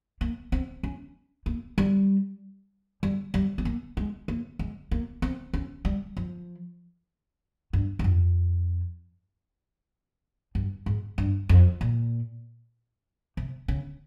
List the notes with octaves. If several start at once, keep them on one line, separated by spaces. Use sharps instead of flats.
A#3
C4
C#4
A#3
G3
G3
G3
C4
A#3
G#3
A#3
G#3
A#3
C4
C#4
G3
F3
G2
G2
F2
G2
G#2
G2
F2
A#2
C3
C#3